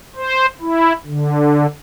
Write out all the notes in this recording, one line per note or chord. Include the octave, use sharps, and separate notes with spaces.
C5
E4
D3